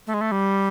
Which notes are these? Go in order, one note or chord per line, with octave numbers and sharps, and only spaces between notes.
A3
G#3
A3
G3